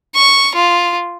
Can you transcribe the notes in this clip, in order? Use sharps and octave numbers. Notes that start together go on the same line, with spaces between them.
C#6
F4